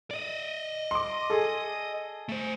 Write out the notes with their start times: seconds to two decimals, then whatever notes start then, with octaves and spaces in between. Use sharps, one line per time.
0.11 D5 D#5
0.91 C6 D6
1.30 G#4 A4
2.29 A3 C5